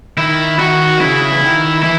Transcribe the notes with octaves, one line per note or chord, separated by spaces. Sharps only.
D#3 E4
D#3 F#4
C#3 E4
E3
D#3
E3 E4